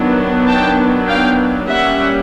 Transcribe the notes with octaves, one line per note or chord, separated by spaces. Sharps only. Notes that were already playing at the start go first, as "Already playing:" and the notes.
Already playing: D#3 F#3 B3 D4
G5 A5
F5 G5
G3 A#3 C#4 E5 F#5